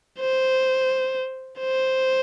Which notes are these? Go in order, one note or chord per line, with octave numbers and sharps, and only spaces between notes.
C5
C5